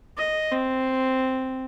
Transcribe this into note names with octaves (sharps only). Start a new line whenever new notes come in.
D#5
C4